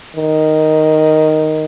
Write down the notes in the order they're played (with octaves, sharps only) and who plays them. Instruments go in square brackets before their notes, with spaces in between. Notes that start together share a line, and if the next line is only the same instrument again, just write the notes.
[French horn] D#3